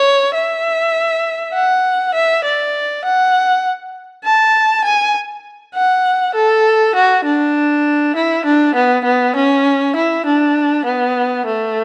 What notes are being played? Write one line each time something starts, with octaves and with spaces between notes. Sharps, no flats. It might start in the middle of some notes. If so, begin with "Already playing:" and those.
Already playing: C#5
E5
F#5
E5
D5
F#5
A5
G#5
F#5
A4
F#4
D4
E4
D4
B3
B3
C#4
E4
D4
B3
A3